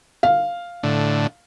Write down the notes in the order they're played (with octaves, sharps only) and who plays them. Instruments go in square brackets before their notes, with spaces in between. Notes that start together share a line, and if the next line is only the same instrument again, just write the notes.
[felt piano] F5
[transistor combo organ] A2 D3